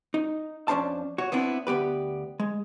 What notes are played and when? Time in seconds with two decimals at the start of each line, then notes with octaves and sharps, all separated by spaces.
0.14 D#4
0.68 F2 C#4 D4 C5 A5
1.18 F#4 C#5
1.32 B3 C4 D4 E4
1.67 D2 B3 G4 B4
2.40 G#3